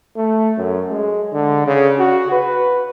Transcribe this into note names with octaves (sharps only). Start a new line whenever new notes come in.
A3
F#2
G#3
D3
C#3
F#4
B4